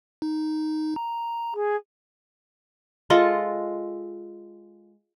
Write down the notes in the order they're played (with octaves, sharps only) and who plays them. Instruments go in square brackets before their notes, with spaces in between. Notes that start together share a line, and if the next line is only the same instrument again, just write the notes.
[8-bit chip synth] D#4
A#5
[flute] G#4
[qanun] G#3 F4 A4 D#5